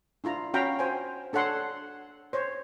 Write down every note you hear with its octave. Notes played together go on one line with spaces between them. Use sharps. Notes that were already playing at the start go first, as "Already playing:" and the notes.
D4 E4 F4 A#5
C#4 F#4 F5 G5 A#5 B5
C5 G5 G#5
D4 A4 C#5 F#5 C6
C5 C#5